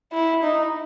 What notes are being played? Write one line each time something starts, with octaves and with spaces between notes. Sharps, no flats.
E4
D#4